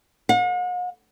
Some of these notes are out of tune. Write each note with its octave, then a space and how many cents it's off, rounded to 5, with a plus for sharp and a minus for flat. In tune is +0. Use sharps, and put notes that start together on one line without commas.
F#5 -45